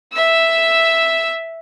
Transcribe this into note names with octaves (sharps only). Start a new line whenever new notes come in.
E5 E6